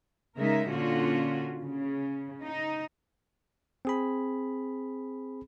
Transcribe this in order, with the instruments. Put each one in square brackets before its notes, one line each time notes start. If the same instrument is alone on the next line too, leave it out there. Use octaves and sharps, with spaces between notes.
[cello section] C#3 G#3 D#4 A#4 E5
A#2 D3 C#4 F4 F#4
C#3
D#4
[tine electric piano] C4 G#4 B5